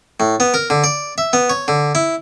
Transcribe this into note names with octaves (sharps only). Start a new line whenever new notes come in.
A2
B3
A#4
D3
D5
E5
B3
C#5
D3
E4